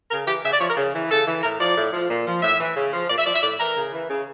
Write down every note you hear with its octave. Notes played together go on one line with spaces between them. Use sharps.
C#3 A#4
E3 G4
C#3 E5
D5
F3 C#5
A#4
C#3
E3
C#3 A4
E3
A2 A#4
F3 D5
A2
F3
A#2
F3
A2 E5
E3
C#3
F3
A#2 D5
E5
F3 D5
E5
A2 D5
E3 A#4
C#3
E3
C#3